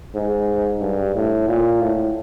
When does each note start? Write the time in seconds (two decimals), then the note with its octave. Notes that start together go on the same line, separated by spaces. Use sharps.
0.15 G#2
0.81 G2
1.15 A2
1.48 A#2
1.81 A2